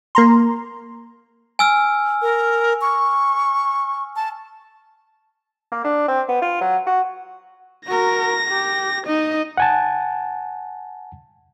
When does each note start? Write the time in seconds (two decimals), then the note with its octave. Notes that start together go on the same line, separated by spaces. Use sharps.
0.15 A#3 A#5 C6
1.59 G#5 E6 F6
2.22 A#4
2.81 C#6
4.16 A5
5.72 A#3
5.84 D4
6.08 C4
6.28 B3
6.42 F4
6.61 F#3
6.87 F#4
7.87 F#4 A#4 A#6
8.48 G4
9.07 D#4 D#5
9.57 F#5 G#5 A5